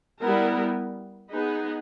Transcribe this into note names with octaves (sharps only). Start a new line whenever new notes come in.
G3 B3 E4 A#4
B3 D#4 G#4 B4